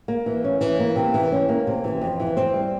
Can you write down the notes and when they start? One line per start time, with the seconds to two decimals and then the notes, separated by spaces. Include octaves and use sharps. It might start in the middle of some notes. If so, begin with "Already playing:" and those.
0.08 A#3
0.26 E3
0.44 C#4
0.61 E3
0.79 A#3
0.96 C3
1.14 E3
1.32 C#4
1.49 A#3
1.67 C3
1.84 E3
2.02 F2
2.20 E3
2.37 C4
2.54 G3